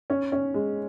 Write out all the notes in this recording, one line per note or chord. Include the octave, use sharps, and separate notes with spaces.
C#4
C#4
G#3